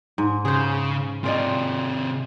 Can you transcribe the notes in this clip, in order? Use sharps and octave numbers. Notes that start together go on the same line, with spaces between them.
G#2
C#3 G#4 C5
C3 F4 G#4 D5 D#5